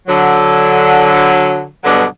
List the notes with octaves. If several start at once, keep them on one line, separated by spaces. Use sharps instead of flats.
D3 F#3
G2 B2 D3 F#3 B3 D4